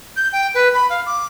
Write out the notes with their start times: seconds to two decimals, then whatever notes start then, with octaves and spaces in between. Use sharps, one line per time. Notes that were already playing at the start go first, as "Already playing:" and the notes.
0.16 G6
0.32 G5
0.54 B4
0.74 B5
0.89 F5
1.06 D6